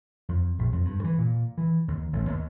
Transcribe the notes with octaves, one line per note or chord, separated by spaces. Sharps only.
F2
A#1
F2
G2
E3
A#2
E3
D#2
A1
D#2